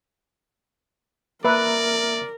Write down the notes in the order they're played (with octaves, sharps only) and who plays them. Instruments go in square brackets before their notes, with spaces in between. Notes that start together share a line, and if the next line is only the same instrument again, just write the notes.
[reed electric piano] A#3 E5 A#5 [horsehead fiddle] A#4 [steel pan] B4 [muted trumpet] D5